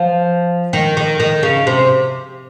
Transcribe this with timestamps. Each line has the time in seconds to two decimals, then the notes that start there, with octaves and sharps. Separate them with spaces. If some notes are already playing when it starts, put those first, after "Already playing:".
Already playing: F3
0.73 D#3
0.97 D#3
1.20 D#3
1.43 C#3
1.67 C3